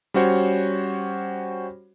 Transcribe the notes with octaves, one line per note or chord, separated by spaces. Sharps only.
G3 C#4 F#4 C5 C#5